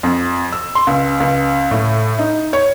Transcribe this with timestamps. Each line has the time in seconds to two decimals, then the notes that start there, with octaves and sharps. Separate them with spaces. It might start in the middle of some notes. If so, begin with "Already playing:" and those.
0.03 F2
0.52 E6
0.75 C6
0.87 C#2
1.20 C#2
1.71 A2
2.19 D#4
2.53 C#5